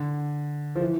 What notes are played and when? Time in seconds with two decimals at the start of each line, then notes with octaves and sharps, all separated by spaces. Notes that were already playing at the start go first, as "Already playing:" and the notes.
Already playing: D3
0.75 F3
0.81 E3